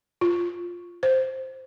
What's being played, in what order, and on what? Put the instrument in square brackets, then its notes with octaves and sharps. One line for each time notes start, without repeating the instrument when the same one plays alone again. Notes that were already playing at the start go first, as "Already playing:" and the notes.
[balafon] F4
C5